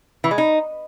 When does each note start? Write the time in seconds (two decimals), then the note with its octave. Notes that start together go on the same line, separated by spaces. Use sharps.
0.24 E3
0.31 G#3
0.38 D#4